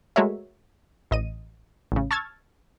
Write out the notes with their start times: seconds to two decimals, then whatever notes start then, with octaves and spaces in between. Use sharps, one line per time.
0.16 G#3 A3 F#4 A#4 C#5 E5
1.11 A1 D#5 D#7
1.92 A1 C#3
2.11 A5 C#6 E6 F6 G#6 A6